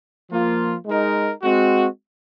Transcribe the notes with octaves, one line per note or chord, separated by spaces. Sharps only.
F3 A#3 F4
G#3 D#4 A#4
G#3 C4 F#4